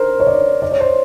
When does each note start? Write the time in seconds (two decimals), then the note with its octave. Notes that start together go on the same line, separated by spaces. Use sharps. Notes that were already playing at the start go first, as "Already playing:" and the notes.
Already playing: A#4 C5
0.20 C#5
0.27 D5
0.62 D5
0.71 C#5
0.80 C5